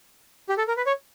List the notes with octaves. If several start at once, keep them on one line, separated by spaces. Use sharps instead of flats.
G4
A4
A#4
B4
C#5